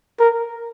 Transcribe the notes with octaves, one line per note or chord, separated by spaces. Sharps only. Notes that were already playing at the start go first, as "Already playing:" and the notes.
A#4